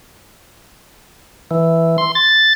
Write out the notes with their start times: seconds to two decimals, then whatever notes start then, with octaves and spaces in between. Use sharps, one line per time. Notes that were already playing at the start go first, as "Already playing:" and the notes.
1.51 E3
1.98 C6
2.15 A6